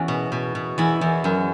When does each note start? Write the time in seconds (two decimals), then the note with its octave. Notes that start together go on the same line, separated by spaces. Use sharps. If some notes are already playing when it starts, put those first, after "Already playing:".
Already playing: E2 C#4 F#4
0.08 B2
0.32 B2
0.55 B2
0.78 E2 E4
1.01 E2
1.24 F#2